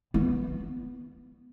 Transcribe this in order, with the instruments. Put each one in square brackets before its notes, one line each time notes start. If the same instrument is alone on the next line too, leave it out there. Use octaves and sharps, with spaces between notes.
[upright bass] B3